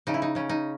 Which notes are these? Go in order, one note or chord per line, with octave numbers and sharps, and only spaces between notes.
C#3 D#4
E4
D#4
C#3 C#4
D#4